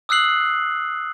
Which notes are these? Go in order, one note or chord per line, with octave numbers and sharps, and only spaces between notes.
D#6 E6 F#6 C7 F#7